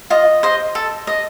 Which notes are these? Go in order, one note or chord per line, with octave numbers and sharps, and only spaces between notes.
F4 D#5
C5 D#5
A4
D#5